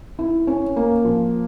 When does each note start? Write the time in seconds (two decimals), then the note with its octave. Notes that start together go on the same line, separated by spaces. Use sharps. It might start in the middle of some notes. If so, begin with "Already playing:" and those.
0.19 E4
0.47 C#4
0.76 A#3
1.05 F3